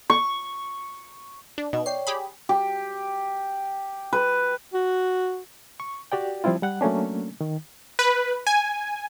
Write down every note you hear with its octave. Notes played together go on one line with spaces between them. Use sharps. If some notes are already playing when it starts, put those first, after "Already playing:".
C#6
D4
B2 D#4 D#5
C#5 D5 G5 C7
G4 G#4 B5
G4
B4
F#4
C#6
F#4 G4 D5 G5
F3 G3 C4 E4 F4
G3 F#5 F#6
F#3 A3 A#3 C#4 D4
D#3
B4
G#5